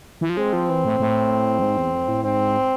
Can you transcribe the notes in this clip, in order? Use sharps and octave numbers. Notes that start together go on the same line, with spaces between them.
E3
F3
G#3 C4
F3
E3
A2
A2
F2
G#2
E2
F2
A2
G#2 C4